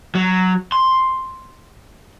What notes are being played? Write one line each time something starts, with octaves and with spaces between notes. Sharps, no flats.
F#3
C6